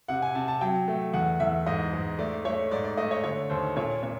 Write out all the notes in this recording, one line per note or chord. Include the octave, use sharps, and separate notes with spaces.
C3 F#5
G#5
C3 A5
A5
F#3 G5
A3
E2 F#5
E2 E5
G#2 D#5
G#2
A3 D5
A3 C#5
G#2 D5
D5
A3 D#5
C#5
D3 C#5
D#2 C5
A#2 C#5
A#2 C#5